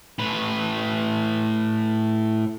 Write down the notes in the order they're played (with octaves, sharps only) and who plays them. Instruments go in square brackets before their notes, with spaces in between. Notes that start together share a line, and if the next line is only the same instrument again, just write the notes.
[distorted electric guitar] A2 B4